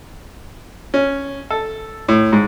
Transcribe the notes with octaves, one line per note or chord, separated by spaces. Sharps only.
C#4
A4
A2
G#2